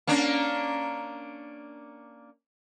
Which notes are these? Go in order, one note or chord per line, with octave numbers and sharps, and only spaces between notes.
A#3 C#4 D4